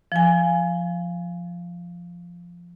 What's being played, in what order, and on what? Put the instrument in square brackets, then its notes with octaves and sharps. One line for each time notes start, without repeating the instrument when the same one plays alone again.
[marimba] F3 G#5